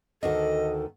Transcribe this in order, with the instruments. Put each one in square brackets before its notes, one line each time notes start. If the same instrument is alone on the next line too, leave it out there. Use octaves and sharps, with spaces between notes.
[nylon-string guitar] D2 D#3 F#4 [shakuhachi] A4 [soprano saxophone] D#5